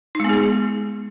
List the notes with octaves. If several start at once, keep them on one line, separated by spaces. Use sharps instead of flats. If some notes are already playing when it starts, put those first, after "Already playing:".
G#3 B3 D#4 G#4